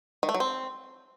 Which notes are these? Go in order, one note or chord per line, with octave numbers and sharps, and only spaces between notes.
D#3
A3
F#3
C4